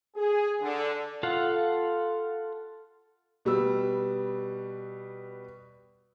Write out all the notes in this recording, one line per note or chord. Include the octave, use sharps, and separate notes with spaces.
G#4
D3
F4 A4 F5 F#5
B2 G3 B3 E6